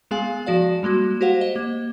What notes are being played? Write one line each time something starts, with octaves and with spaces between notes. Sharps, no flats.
G#3 B3 G#4 F5 G#5
F3 F#4 D5 F5
G3 G#3 A#3 F#4
F#4 G4 C5 F5 F#5
D#5
A#3